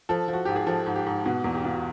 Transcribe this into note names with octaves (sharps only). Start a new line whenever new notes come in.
F3 A4
F3
F#4
G#2 G4
G#4
F3 A4
G#2
G4
G#2
B2 F#4
E2
G4
B2 F4
F#4